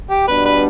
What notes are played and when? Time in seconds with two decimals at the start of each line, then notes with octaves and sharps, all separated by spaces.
0.10 G4
0.28 B2 G3 B3 D4 B4
0.45 B4